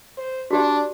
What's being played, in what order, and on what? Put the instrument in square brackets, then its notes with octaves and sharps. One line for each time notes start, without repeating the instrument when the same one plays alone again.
[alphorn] C5
[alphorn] D4 [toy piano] F#4 G4 D5